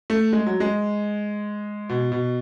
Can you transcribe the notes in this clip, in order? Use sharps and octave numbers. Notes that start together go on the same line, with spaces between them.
A3
G#3
F#3
G#3
B2
B2